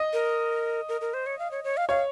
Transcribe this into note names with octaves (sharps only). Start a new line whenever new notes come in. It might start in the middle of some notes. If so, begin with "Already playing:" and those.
Already playing: D#5
A#4
A#4
A#4
C5
C#5
F5
C#5
C#5
F5
C#5 F5